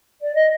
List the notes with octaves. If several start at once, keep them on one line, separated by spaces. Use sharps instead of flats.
D5
D#5